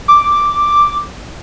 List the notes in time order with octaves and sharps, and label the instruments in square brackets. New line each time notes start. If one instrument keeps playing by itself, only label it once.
[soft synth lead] D6